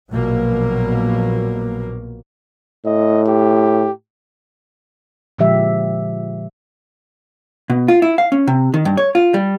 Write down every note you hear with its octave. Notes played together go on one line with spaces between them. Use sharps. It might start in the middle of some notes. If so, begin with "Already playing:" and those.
A#1 B2 F#3 A#3
A2 D#5
G4
A#2 D3 F3 G#3 G4 E5
B2
F4
E4
F5
C#4
C3
D#3
G2
C#5
F4
G3